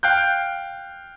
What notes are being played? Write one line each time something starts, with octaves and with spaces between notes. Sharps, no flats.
F5 G5 F#6 G6